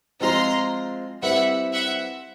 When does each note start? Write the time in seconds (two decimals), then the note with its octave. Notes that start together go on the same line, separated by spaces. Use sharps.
0.20 F3 G#3 C4 F4 A#5 C6
1.22 G3 C4 E4 G4 B4 E5 F#5
1.73 E5 F#5